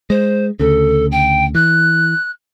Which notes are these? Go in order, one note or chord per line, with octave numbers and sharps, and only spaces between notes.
G#3 C5
D2 C#3 A4
G5
E3 F#6